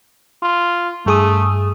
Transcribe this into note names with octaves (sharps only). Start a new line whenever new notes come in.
F4
G2 A3 G#4 D#6